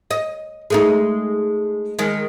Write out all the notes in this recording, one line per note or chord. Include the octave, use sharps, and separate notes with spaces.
D#5
G#3 A3 D#4
D#3 G#3